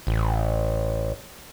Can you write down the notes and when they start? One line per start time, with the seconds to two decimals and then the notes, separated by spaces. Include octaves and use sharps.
0.07 A1